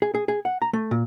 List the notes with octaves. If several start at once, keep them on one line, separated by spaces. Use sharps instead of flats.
G#4
G#4
G#4
F#5
A#5
A3
A#2